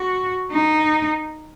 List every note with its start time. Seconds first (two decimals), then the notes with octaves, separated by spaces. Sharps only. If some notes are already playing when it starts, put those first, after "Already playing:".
Already playing: F#4
0.51 D#4